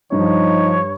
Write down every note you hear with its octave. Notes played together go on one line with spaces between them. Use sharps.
G2 F3 D#4 C#5